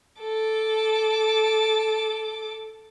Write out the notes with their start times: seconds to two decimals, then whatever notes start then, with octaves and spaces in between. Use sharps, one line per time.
0.21 A4 D6